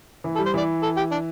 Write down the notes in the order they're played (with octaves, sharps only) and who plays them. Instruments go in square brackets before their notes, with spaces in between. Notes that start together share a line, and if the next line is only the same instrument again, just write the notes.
[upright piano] E3
[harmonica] A4
[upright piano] G3
[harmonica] C5
[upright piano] E3 [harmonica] D5
[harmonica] A4
G4
D4